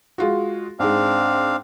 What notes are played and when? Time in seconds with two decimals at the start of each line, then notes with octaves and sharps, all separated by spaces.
0.18 G#3 F4 F#4
0.80 G#2 G#3 C4 D4 F5